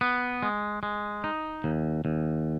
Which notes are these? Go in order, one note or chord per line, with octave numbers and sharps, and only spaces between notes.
B3
G#3
G#3
D#4
D#2
D#2